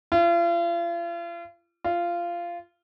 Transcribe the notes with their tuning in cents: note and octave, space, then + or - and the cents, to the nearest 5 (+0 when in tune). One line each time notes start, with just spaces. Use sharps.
F4 -40
F4 -15